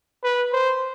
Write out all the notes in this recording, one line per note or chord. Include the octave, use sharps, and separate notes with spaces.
B4
C5